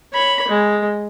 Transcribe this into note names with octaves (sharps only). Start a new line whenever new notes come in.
C#5 B5
G#3